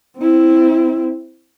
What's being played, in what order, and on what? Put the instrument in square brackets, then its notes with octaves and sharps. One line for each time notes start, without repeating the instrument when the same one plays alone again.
[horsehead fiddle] C4 E4